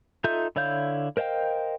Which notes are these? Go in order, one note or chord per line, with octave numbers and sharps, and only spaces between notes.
D#4 F4 A4 E5 G6
D3 E4 C#5 F5 G6
A#4 C5 D#5 F5 G5